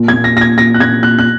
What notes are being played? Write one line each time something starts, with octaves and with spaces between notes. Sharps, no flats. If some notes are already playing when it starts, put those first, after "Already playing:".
Already playing: A#2
G#6
A#2
A#6
A#2 A#6
G#6
A#2 A#6
F#6
A#2 G#6
A#2 F#6
F#6